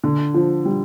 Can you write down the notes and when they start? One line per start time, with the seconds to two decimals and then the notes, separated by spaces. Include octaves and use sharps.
0.04 D3
0.34 F3
0.65 G3